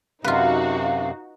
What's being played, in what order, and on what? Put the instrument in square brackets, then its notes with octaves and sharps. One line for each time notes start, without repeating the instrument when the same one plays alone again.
[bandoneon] F#2 C3 [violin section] D#4 F#4 [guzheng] F4 B4 [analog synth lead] F5